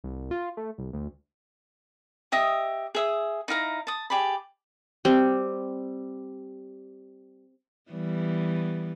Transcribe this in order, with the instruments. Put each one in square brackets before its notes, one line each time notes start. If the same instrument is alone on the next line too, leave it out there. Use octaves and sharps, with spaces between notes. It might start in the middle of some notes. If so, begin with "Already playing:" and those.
[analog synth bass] C2
F4
A3
C2
D2
[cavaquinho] G4 D#5 E5 D#6
G#4 E5 D#6
D#4 E4 F5 A#5
A5 D#6
G4 G#4 D5 B5
[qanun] G3 C4
[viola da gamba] E3 G3 B3